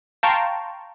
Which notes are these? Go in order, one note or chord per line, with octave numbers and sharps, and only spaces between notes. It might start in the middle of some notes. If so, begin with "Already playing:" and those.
F5 G5 A5 A#5 C6 C#6